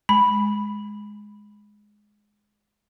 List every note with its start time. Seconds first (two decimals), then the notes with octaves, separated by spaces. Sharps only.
0.09 G#3 B5